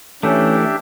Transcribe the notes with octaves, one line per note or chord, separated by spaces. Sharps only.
E3 A3 C#4 D4 G4 E5